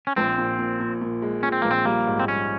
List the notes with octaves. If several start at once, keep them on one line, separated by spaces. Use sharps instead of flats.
C#4
A#1 C4
A#2
A#2
A#2
A#2
G#3
A#2 C#4
C4
A#1 A#3
C4
G3 A#3
G#2
C4
G3 C#4